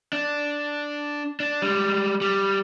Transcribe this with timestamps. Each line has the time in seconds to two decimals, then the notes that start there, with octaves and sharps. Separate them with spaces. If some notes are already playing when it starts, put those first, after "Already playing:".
0.13 D4
1.40 D4
1.62 G3 G#3
2.21 G3